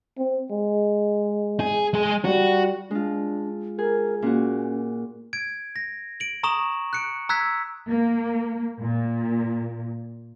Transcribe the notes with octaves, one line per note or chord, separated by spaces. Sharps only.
C4
G#3
G#4
G#3 G#4
G3 F#4
G#3 D4 F4
G#4 A#4
A#2 C#4 F#4
G#6 D7
A#6
D7 F#7
A#5 C#6 D#6 E7 F#7
F#6 C#7 D7
A#5 E6 F#6 G#6 B6
A#3
A#2